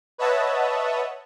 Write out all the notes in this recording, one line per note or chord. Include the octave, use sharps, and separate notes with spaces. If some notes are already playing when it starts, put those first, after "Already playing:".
B4 C#5 D#5 E5 F#5 A5